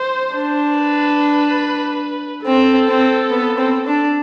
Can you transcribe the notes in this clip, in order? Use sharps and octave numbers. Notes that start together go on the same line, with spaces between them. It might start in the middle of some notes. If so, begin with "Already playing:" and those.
Already playing: C5
D4
B4
C4 A4
C4
B3
C4
D4